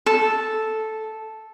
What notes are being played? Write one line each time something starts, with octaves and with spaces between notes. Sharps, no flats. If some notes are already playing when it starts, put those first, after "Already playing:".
A4